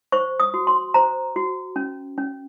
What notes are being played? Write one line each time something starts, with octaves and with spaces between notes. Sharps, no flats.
C5 C#6
D#6
F#4
C6
C5 A#5
F#4
C#4
C#4